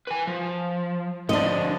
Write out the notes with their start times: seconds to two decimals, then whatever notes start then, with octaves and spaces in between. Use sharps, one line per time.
0.07 B4 G#5
0.27 F3
1.29 D3 F3 D4 D#5